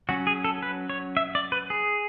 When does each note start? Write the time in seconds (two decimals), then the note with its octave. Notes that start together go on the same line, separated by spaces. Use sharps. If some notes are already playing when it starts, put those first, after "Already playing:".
0.09 F#3 C#4 F#4
0.27 G#4
0.45 A4
0.63 B4
0.90 C#5
1.17 E5
1.35 D5
1.52 B4
1.70 G#4